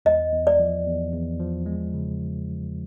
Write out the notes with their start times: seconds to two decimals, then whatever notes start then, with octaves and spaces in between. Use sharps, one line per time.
0.05 E2 D#5
0.32 E2
0.47 D5
0.60 F3
0.87 E2
1.13 E2
1.40 F3
1.66 G#3
1.94 C#3